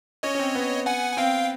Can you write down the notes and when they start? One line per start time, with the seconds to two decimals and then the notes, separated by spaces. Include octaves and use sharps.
0.23 C#4 C#5 D#5
0.35 C#4
0.39 C4
0.55 B3
0.86 F#5 G#5
1.13 G#5
1.17 C4 F5 G5